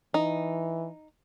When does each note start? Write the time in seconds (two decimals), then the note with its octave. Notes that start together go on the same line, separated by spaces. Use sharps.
0.14 E3 D#4